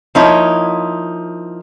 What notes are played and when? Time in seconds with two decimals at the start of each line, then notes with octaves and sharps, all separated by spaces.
0.15 F3 A#3 D#4 E4 C#5